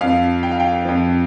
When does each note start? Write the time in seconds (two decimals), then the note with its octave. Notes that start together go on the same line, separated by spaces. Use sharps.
0.01 F2 F3 F5
0.43 G5
0.51 F5
0.60 G5
0.85 F2 F3